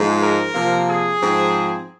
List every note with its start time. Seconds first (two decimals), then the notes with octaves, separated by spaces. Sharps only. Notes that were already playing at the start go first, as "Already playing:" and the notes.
Already playing: G#2 F3 G#3
0.21 A#4
0.55 C3 F3 A#3
0.87 G#4
1.21 G#2 F3 C4